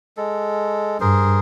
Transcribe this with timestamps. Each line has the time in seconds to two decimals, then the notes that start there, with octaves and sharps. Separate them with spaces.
0.17 G#3 A4
1.00 G2 G#4 A#4 C5